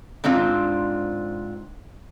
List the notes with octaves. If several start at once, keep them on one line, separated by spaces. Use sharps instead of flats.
G#2 C4 D4 F4